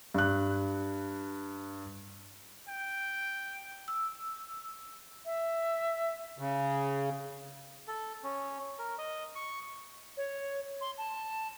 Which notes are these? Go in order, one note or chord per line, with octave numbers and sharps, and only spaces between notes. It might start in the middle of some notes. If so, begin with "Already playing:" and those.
G2 F#6
G5
E6
E5
C#3
A4
C#4
A#4
D#5
C#6
C#5
C6
A5